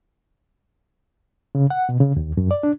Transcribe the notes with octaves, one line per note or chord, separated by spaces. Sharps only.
C#3
F#5
B2
C#3
D#2
F#2
D5
D4